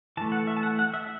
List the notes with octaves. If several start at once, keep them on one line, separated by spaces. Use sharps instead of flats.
E3 A3 A5
F#5
E5
A5
F#5
F#5
E5